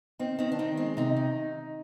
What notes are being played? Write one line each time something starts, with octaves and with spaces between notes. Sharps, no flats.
D#3 C4
D#3 C4
D4
D#3 C4
G#3 C4
C3 D#4
D#3